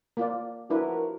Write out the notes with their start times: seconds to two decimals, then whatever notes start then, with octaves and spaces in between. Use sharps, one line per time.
0.17 A#3 F4 D5
0.70 F3 D4 E4 F#4 A#4 B4